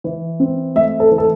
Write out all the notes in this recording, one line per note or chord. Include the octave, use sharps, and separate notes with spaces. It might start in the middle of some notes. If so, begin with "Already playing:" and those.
E3
C4
A3 E5
A4
E3
A4